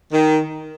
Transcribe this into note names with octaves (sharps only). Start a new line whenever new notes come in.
D#3